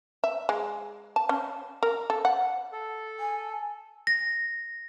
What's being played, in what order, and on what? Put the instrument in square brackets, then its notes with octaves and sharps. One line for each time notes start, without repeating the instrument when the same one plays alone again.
[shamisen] E5
G#3
A5
C#4
A#4
A4
F#5
[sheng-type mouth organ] A4
[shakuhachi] G#5
[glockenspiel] A#6